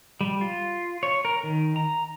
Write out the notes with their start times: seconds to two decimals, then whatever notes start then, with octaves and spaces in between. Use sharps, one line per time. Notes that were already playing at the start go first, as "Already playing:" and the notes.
0.21 G3
0.41 F4
1.03 C#5
1.25 A#4
1.43 D#3
1.76 A#5